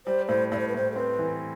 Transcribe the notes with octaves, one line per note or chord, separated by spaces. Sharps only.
G3 C5
A2 C5
A2 D5
C5
B4
A2 C5
A4
C4 B4
E3